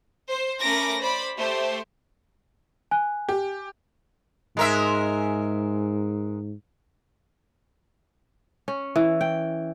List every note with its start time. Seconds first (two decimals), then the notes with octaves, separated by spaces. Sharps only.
0.29 C5
0.62 A3 C#4 A#4 B5 D6 A#6
1.00 C5 D5 B5
1.37 A3 G4 C5
2.91 G#5 F#6
3.29 G4
4.57 G#2 G#3 A#4 E5
8.68 C#4
8.96 E3
9.21 G5